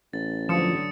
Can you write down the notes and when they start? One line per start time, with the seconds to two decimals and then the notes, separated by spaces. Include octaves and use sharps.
0.13 A1 A6
0.49 G2 D3 F3 F#3 D#6 C#7 E7